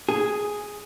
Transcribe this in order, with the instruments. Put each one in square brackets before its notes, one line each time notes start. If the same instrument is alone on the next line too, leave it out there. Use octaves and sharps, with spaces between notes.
[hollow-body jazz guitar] G#4